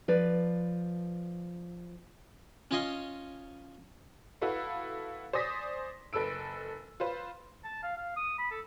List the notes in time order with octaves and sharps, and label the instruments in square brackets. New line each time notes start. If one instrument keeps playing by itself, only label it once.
[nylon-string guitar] F3 B4 D5
[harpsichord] C#4 F4 C#5 D#5 G#5 C6
[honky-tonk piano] E4 F#4 A4 B4 F5
C5 D5 G#5 D#6 A#6 B6
F#1 A4 B4 E6 D7
F4 B4 C5
[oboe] A5
F5
F5
D#6
B5
A4